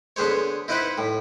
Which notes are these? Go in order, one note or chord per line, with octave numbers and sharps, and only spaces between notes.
D3 B3 G#4 C5 C#5
D#4 E4 B4 C5 F#5 B5
A2